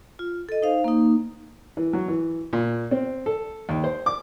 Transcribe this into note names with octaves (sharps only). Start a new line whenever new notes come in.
F4
A4 D#5
D#4 C5 F5
A#3 D#4
E3
F#3
E3
A#2
C4
A4
D#2
C5
D6